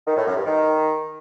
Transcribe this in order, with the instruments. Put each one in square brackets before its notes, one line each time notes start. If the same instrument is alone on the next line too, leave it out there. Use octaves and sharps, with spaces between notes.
[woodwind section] D#3
A2
F#2
G2
D#3